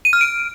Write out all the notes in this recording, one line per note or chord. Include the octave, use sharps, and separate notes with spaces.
D#7
F6
D7